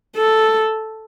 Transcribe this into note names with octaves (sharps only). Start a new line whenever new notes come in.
A4